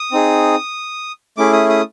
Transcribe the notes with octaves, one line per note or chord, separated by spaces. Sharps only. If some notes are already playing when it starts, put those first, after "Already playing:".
Already playing: D#6
C4 D#4 G#4
A3 C#4 E4 G#4 D6
D#6
D#6